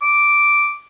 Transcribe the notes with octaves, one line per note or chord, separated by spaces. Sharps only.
D6